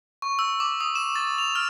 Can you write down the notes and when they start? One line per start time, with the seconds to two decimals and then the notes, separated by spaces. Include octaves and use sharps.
0.22 C#6
0.39 E6
0.60 D6
0.81 D#6
0.95 E7
1.16 A6
1.38 F7
1.55 F6